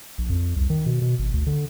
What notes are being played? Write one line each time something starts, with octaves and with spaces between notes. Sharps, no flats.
A#1
F2
C2
D#3
B2
B2
G#1
D2
D3